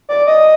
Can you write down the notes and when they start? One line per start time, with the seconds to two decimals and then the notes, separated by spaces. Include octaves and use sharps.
0.09 D5
0.27 D#5